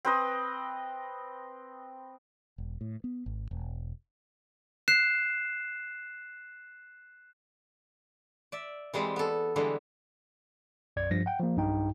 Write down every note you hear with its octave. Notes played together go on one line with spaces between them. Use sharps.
C4 B4 D#5
E1
A2
B3
G#1
E1
F#6 C7 E7
D5 E5
E3 G3 G#3 C4
B3 A4
D3 E3 G3 G#3
B1 F#2 D5 G#6
G2 F3 A#6
F#5 G5
F3 A#3
B1 G2 D#4 G5